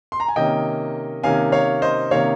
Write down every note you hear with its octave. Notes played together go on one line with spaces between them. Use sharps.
C6
A#5
G#5
C3 D#3 A#3 C#4 D#5 G5
C3 D#3 A#3 C#4 F5 G#5
C#5 F5
C5 D#5
C3 D#3 A#3 C#4 C#5 F5